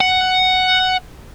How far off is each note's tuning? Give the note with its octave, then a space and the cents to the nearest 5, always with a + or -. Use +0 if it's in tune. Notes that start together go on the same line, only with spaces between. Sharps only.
F#5 +5